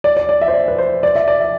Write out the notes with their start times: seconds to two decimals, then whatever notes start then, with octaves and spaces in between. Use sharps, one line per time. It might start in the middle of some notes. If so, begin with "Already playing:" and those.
0.04 D5
0.17 D5
0.29 D5
0.41 E5
0.48 C5
0.54 D5
0.68 B4
0.78 C5
1.03 D5
1.15 E5
1.28 D5
1.40 E5